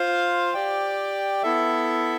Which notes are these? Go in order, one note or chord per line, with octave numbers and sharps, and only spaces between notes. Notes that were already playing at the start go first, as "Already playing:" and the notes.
Already playing: F4 C5 F5
G4 D5 G5
B3 E4 A4 E5